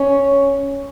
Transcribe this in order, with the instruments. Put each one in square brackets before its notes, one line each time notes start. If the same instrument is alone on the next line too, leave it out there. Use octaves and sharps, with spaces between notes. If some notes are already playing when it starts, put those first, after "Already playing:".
Already playing: [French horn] C#4